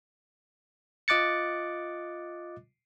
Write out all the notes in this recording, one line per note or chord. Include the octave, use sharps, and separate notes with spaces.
F4 D#5 D6 F#6 A6 C#7